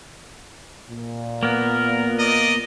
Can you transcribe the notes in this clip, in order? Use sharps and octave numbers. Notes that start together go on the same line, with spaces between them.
A#2
A#3 B3 A#4
D5 D#5 A#5